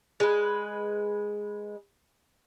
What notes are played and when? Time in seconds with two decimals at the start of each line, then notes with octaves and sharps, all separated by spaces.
0.20 G#3 B4